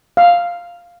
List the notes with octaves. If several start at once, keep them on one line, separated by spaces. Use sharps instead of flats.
F5